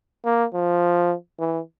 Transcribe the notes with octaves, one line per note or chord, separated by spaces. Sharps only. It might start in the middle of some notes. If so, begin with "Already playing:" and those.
A#3
F3
E3